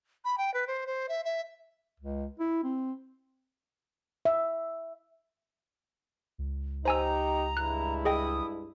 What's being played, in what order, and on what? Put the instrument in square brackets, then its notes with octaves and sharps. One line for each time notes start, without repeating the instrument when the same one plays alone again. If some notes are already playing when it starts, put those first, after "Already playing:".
[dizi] B5
G5
B4
C5
C5
E5
E5
[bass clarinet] C#2
E4
C4
[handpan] E5
[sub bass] C#2
[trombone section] D#4 G4 [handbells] C5 G#5 E6 [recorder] A#5
[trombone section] G2 G#3 E4 [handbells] F#6
[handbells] G#4 D#5 G5 [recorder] D#6